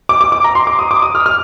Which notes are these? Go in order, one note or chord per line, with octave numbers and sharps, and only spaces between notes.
D6
D6
D6
A#5
C6
D6
D#6
D6
D#6
F6
F6